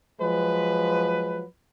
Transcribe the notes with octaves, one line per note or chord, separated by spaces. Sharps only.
F3 F#3 G#3 B4